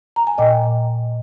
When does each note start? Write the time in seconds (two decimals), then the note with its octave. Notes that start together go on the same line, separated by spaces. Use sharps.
0.16 A#5
0.27 G#5
0.38 A#2 D#5 G5